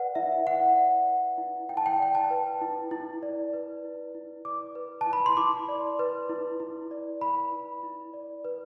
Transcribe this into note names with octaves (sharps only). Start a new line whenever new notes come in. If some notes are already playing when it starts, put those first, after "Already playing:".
Already playing: B4 D5 F#5
E4 E5
E4 F#5
D5
B4
E4
E4 G5
A5
G5
A5
D5 G5
A5
B4
E4
E4
D5
B4
E4
E4
D5 D6
B4
A5
E4
B5
C6
E4 D6
D5
B4
E4
E4
D5
B4 B5
E4
E4
D5
B4